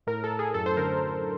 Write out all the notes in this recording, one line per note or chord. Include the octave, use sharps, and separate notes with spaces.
A2 A#4
A4
A2
G#4
F#2 A4
C5
D3 A#4